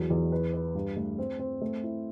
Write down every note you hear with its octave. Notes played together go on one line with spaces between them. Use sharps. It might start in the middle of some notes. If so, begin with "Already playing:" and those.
Already playing: E2 F#3
E2
B4
B4
G2
A3
C4
C4
A3
E4